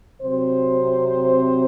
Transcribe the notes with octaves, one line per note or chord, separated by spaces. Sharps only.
C3 F#3 C4 C5